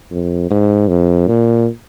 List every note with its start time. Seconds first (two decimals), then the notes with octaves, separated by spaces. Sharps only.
0.11 F2
0.50 G#2
0.88 F2
1.27 A#2